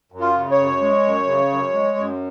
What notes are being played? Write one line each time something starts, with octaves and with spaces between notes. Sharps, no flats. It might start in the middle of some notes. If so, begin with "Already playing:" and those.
F#2
F4
C#3
C#5
F#2
G#3
F#2
C#3
F#2
G#3
F#2